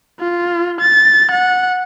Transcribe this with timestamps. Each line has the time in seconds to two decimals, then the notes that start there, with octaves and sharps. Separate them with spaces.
0.20 F4
0.81 A6
1.32 F#5